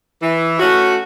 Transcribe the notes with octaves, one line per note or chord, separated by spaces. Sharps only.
E3
A3 C#4 F#4